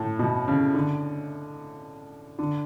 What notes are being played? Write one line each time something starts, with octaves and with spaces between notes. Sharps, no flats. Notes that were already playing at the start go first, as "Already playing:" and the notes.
Already playing: A2
B2
C#3
D3
D3